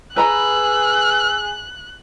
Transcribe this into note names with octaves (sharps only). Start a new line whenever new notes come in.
G#4 B4 A#5 B5 E6 F#6